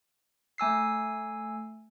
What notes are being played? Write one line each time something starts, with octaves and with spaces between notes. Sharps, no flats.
A3 G#5 E6 C7